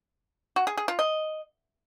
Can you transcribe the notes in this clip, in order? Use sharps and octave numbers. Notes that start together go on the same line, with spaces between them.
F#4
G#4
G#4
F4
D#5